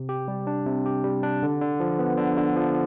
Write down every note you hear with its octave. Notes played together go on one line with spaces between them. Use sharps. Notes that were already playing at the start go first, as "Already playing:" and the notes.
Already playing: C3
G4
G3
D4
C3
G4
G3
D4
D3
D3
F3
B3
D3
D3
F3